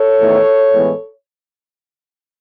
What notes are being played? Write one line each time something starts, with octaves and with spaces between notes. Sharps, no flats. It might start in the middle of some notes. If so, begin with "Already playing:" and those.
Already playing: A4 C#5
E2 D#3 A3 D#4
A2 E3 G#3 B3